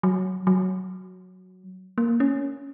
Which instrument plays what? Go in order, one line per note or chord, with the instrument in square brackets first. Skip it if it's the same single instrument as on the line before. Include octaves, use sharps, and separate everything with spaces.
[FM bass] F#3
F#3
A#3
C#4